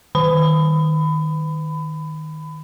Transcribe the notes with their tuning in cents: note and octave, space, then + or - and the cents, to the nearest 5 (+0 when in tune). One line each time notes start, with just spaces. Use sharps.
D#3 +5 B5 +25